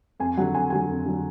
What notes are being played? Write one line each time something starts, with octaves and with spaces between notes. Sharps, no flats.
F2 G#5
D3 F#3 F#5
F2 G#5
D3 F#3 G#5
F2
D3 F#3